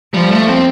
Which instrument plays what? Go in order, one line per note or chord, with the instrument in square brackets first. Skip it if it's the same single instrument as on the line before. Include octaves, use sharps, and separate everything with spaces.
[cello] F3 [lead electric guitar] G3
[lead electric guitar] A3
C4